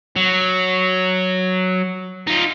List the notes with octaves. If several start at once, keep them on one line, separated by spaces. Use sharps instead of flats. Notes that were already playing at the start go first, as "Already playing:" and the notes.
F#3
D#4 F4